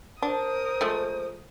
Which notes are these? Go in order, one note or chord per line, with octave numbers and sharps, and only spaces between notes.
D4 A#4 C5 D#6
F3 G#3 A3